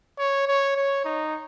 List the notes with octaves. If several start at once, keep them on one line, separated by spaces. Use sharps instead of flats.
C#5
C#5
C#5
D#4